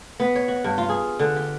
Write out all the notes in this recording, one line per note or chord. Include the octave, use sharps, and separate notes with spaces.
B3
C#5
F#4
G2
F4
G#4
D3
G4